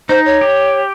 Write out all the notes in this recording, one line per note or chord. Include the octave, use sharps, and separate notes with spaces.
D#4 C5
C#5
G4